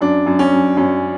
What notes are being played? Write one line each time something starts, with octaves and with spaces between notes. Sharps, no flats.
F#2 D4
F#2
C#4
F#2
F#2 C#4